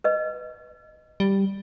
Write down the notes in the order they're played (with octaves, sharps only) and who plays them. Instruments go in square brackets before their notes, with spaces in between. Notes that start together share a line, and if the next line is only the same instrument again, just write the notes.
[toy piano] B4 D#5
[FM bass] G3